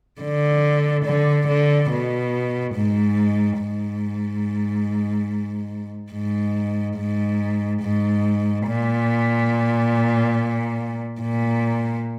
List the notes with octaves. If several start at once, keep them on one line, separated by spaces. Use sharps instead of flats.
D3
D3
D3
B2
G#2
G#2
G#2
G#2
G#2
A#2
A#2